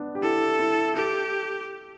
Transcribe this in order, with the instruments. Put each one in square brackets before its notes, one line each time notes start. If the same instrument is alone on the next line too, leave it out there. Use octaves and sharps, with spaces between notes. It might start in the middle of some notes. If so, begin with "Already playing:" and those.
Already playing: [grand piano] B3 D4
G4
[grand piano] E4 [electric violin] A4
[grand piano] E4
[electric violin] G4 [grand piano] A4